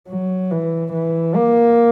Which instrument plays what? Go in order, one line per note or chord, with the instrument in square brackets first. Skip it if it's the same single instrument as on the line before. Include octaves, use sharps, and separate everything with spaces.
[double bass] F#3
E3
E3
A#3